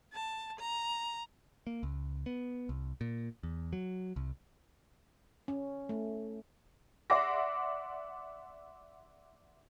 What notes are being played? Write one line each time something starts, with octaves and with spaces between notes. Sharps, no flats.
A5
A#5
A#3
C#2
B3
C2
A#2
E2
F#3
C2
C#4
A3
D5 E5 F#5 C6 D6 A#6